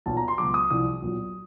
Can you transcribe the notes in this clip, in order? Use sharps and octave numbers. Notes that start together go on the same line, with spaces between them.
B1 A#2 F#3 A5
A#5
C6
C#2 B2 F#3 D6
D#6
C2 C3 F3 D#6
B1 A#2 F#3